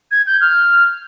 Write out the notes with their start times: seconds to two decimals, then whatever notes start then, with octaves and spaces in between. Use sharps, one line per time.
0.11 G#6
0.27 G6
0.41 F6